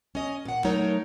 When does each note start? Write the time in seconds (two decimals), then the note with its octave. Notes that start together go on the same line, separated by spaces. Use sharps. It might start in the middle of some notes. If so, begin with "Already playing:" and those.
0.15 C#4 D#5
0.45 A#2 F#5
0.64 F#3 A3 D#4 A#4 C#5